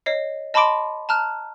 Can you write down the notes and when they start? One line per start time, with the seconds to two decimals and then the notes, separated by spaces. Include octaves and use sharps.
0.06 C#5 D#5 C7
0.54 D#5 A5 B5 C6 D6 D7
1.09 A5 A#5 F6 F#6